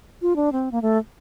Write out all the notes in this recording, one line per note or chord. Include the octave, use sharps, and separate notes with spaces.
F4
D4
C4
A#3
A3